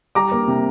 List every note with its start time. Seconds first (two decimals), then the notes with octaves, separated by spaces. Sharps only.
0.15 G3 A#5 D6
0.31 A#3
0.48 C3